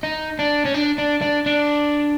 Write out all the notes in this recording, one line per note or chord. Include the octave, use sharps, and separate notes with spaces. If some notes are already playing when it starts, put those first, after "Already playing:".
D#4
D4
C#4
D4
D4
D4
D4